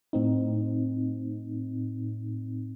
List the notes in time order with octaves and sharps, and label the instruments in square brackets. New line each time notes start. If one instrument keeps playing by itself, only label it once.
[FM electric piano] A2 C4 D#4